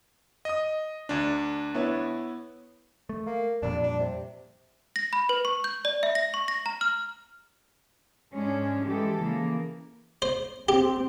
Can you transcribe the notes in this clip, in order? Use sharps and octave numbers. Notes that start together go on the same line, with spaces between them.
D#5 D#6
D2 D4
B3 E4 C#5
A3
A#3
F2 A#2 G3 D4
D4
C3
A#6
B5
B4
C#6
G6
D5
E5
A#6
C#6
A#6
A#5
F6
G#2 G#3 C#4 D4
E3 G#3 G4 A4
C#3 E3 A#3
C5
C4 G4